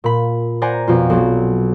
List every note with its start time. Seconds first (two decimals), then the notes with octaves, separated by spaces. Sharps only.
0.04 A#2 B5
0.62 C5 D5 F#5 G#5 A#5
0.87 F2 B2 F4
1.10 B1 F#3